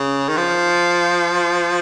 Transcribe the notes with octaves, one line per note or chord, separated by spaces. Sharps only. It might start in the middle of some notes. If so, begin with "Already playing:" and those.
Already playing: C#3
D#3
F3